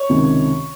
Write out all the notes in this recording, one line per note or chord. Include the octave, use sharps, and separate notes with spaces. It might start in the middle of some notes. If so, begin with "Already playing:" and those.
Already playing: C#5
C#2 C3 D#3